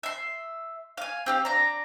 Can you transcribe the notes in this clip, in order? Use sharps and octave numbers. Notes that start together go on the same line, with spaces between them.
E5 C6
F5 G#5
C4 G4 F5
D4 A#5